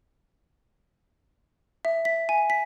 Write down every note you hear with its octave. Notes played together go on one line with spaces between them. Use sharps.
E5
B6
G#5
B6